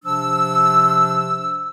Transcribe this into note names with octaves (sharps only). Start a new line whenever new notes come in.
C3 F3 D4 E6